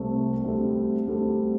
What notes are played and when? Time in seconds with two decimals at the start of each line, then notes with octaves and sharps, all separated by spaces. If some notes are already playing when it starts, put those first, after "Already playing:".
Already playing: C2 C3 A3 C4
0.44 D2 D3 G3 C4 A4
1.07 D2 D3 G3 C4 A4